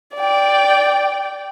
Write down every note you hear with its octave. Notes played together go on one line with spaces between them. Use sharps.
D5 G5